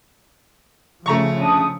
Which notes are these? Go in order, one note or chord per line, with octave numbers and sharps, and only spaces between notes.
C#3 F3 A3 A#5 C#6
D4 D#6